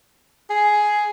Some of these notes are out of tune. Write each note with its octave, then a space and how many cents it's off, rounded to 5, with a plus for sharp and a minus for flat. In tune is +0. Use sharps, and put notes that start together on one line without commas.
G#4 +5